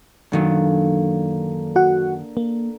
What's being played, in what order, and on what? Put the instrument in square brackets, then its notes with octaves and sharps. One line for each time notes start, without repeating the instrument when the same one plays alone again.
[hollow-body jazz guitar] F#2 D#3 F#3 [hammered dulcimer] D3 A#3
[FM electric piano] F#4 F#5
A#3